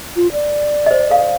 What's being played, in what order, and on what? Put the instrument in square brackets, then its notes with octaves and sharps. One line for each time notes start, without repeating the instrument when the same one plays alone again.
[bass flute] F4
D5
[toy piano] C5 D#5
A4 F5